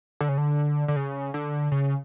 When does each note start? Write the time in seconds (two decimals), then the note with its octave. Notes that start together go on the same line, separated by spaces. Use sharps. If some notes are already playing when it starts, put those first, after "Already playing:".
0.21 D3
0.29 C#3
0.38 D3
0.88 D3
0.96 C#3
1.34 D3
1.72 C#3